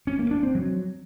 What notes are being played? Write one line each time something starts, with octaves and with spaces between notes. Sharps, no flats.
C#4
A#3
D4
C4
F#3